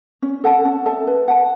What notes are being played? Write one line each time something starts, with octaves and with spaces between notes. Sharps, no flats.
C#4
A4 F#5 A5
C#4
A4 E5 A5
B4
F#5 A5